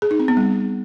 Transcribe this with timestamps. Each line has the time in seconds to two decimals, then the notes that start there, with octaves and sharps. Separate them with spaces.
0.02 G#4
0.11 D#4
0.19 C4
0.28 B3
0.37 G3